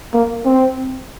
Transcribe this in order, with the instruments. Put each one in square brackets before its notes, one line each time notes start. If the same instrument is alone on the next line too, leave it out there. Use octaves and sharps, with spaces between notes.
[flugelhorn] A#3
C4